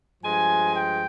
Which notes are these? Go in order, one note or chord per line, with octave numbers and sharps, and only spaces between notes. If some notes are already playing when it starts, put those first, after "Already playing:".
G2 F3 G#3 G#5
G5